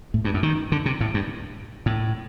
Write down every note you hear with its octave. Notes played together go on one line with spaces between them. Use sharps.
A2
G2
F#2
D#3
D3
C3
A2
G2
A2